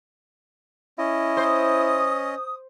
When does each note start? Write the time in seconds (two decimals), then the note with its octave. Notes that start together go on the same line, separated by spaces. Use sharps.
0.99 C#4 E4 D#5
1.37 C5 D#6